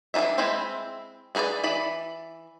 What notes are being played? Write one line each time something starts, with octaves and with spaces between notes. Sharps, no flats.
E3 G3 D4 D#4 E5
G#3 C4 E4 C5 B5
B3 G#4 A#4 B4 D5
E3 D5 B5